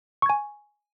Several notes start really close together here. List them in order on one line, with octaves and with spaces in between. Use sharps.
C#6 G#6 G#5